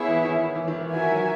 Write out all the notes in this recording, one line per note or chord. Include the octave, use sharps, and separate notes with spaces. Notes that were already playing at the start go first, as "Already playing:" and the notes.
Already playing: B3 E4 G#4 C#5 E5
E3
D#3
E3
D#3
E3
E3 F#4 A#4 E5 G#5
F#3